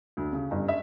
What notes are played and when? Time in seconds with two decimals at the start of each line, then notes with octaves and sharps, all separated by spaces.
0.17 D2
0.33 C#3
0.51 G1
0.68 E5